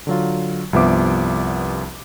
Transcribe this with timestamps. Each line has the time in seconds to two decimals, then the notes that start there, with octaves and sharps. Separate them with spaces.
0.07 D3 F#3 F4
0.73 C2 G2 F3 B3 E5 D6